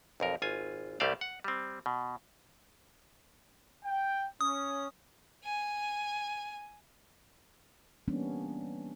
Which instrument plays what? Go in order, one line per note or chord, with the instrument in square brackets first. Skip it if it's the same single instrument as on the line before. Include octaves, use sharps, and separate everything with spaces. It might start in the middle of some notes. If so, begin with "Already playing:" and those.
[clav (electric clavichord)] B1 F2 A#4
G#1 F4 G#5
C2 G3 A3 C5 D5 F5
F#5
G3 C4
B2
[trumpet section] G5
[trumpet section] C#4 [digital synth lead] D#6
[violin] G#5
[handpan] E3 G3 A#3 B3 C#4 D4